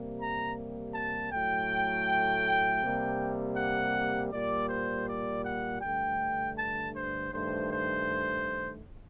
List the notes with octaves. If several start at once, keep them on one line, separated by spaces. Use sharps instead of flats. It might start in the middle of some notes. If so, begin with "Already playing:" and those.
Already playing: C3 G3 A#3
A#5
A5
A2 F#3 A3 G5
C3 G3 A#3
F#5
A#2 G3 A#3 D5
C5
D5
F#5
G2 D3 A3 G5
A5
C5
G2 D#3 A3 C5
C5